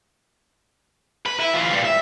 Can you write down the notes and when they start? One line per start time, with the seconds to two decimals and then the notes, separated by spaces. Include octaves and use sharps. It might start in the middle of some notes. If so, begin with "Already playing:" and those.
1.26 B4
1.40 E4
1.53 E3 F4
1.71 A#2 G3
1.84 E5